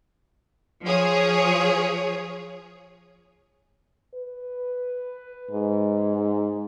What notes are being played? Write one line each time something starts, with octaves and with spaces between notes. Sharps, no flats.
F3 G#4 C#5
B4
G#2